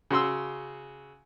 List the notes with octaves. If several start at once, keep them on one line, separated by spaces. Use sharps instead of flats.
C#3 F#4 C6 E6